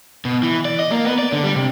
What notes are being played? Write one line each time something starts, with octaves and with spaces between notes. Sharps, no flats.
B2
E3
D5
D#5
A#3
B3
D5
D3
G3
C3